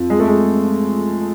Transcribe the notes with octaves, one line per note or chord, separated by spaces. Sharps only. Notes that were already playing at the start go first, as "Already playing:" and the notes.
Already playing: F2
G#3
A3
G#3